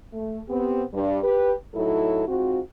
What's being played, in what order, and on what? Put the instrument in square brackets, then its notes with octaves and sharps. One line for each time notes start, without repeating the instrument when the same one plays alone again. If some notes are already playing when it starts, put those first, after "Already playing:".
[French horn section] A3
B3 C4 G4
G2
G4 B4
A2 F#3 D#4 E4 A4
G#2 C4 F4 F#4